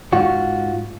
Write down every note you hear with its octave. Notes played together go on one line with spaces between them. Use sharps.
G#2 F4 F#4